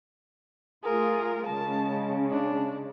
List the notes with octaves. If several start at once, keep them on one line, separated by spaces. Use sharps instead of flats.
A3 F4 G#4 A#4
C#3 G#3 A5
D4